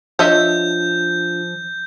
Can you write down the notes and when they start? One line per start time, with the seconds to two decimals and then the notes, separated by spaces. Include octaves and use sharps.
0.19 F3 D4 F4 C#5 D#5 E5 G6